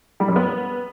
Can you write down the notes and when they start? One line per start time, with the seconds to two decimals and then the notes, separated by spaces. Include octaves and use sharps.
0.20 G3
0.28 F#2
0.36 B3